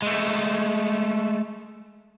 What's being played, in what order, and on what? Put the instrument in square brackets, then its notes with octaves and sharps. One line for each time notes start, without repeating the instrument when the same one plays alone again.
[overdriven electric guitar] G#3 A3